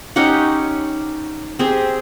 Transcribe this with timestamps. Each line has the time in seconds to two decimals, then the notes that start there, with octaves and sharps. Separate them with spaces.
0.16 C#4 D#4 G4 F#5
1.59 C4 G4 G#4